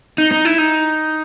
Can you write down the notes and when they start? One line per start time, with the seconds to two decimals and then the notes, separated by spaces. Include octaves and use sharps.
0.18 D#4
0.32 D#4
0.45 E4
0.58 D#4